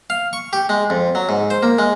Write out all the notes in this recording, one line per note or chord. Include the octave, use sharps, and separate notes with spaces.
F5
C#6
G4
G#3
F2
F#3
G#2
C5
A#3
G#3